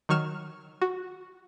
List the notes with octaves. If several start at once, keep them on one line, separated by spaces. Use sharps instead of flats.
D#3 F#3 C#6 F6 E7
F#4